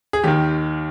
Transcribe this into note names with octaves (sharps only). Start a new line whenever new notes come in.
G#4
D#2 D#3 G4